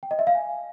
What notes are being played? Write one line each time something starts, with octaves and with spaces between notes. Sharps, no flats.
G5
D#5
E5
F5
G#5